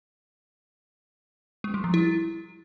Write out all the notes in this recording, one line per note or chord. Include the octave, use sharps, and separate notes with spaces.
G#3
G3
F3
E4